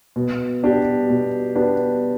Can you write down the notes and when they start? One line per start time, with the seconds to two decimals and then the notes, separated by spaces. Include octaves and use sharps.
0.16 B2
0.63 B3 D4 G4
1.09 B2
1.55 B3 D4 G4